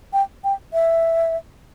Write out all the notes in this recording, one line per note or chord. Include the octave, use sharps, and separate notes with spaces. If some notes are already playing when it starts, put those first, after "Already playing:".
G5
G5
E5